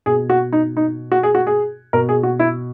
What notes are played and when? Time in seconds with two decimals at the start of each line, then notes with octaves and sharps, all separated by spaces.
0.06 B2 G#4
0.30 F#4
0.53 D#4
0.77 D#4
1.12 F#4
1.23 G#4
1.35 F#4
1.47 G#4
1.93 B2 A#4
2.09 G#4
2.23 F#4
2.39 E4